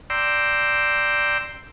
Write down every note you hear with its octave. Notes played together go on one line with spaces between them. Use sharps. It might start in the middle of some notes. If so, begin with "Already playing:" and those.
D5 G5 A#5 C6 E6